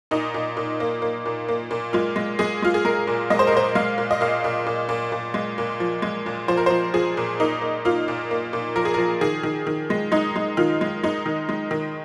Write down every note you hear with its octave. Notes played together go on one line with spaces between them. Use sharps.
A#2 D#4
A#2
A#2
A#3
A#3
A#2
A#3
A#2
G#3 F4
G#3
G#3 G#4
G#3 F4
G#4
G#3 A#4
A#2
G#3 D#5
C5
A#4
A#2 C5
G#3 F5
A#2
D#5
A#2 F5
A#2
A#2
A#2
A#2
G#3
A#2
F3
G#3
A#2
F3 C5
A#4
C5
F3
F3 G#4
A#2
A#3 D#4
A#3
A#3 F4
A#2
A#3
A#2
F3 A#4
G#4
A#4
F3
D#3 G#4
D#3
D#3
G#3
G#3 D#4
G#3
D#3 F4
G#3
G#3 D#4
D#3
G#3
D#3